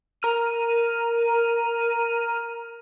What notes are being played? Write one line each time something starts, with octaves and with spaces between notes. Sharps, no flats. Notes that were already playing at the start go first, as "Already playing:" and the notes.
A#4 F6 D#7